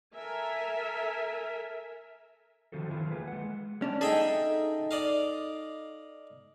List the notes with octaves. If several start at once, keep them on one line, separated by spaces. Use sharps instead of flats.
A4 A#4 E5 G#5
D3 D#3 F3 C4 F#4 A4
D#3 E3 F#3 E4 F4
A3 A#3 G#4 B4
G#3 F#5
C#4 D4
D#4 G#4 A4 E5 G5
D5 D#5 F5